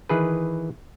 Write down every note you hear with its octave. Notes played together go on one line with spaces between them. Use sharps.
D#3 E3 G#4 B4